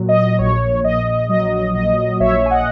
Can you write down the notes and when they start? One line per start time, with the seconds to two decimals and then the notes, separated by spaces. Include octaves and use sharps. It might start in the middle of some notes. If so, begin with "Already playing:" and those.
Already playing: A#2 F#3
0.09 D#5
0.39 A#1 C#5
0.84 A#1 D#5
1.29 F#3 D#5
1.75 A#2 D#5
2.20 A#1 C#5 E5
2.46 G#5
2.51 D#5 F#5